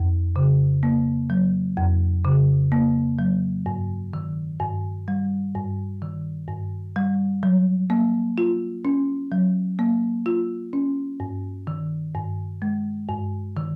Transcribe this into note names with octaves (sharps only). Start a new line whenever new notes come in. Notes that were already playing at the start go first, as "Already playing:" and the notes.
Already playing: F2
C#3
A#3
F#3
F2
C#3
A#3
F#3
G2
D#3
G2
G3
G2
D#3
G2
G3
F#3
A#3
F4
C#4
F#3
A#3
F4
C#4
G2
D#3
G2
G#3
G2
D#3